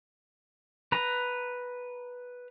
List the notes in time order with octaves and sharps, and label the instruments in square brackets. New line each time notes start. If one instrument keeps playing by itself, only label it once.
[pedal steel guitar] B4 A#5